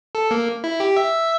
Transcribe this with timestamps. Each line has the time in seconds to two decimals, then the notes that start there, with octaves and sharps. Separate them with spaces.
0.15 A4
0.31 A#3
0.64 E4
0.80 G4
0.96 E5